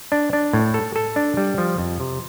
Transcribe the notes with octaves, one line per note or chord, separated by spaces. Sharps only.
D4
D4
A2
A4
A4
D4
G3
F3
F2
C3